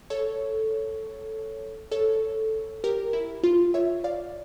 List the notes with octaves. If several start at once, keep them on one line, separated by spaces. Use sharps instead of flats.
A4 C#5
A4 C#5
G4 A#4
E4
F4
C#5 E5
D5 F5